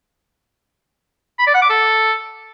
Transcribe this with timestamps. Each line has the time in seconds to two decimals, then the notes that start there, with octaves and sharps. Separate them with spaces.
1.39 B5
1.47 D5
1.54 F#5
1.62 D6
1.70 A4